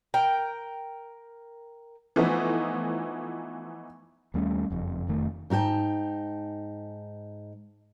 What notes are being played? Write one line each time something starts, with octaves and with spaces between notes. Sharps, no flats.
A#4 G5
E3 F3 A3 B3 D#4
D#2 G3 A3 C#4
F#1 F2
F1 F2 D#3 A3
G#2 D#4 F4 G5 A5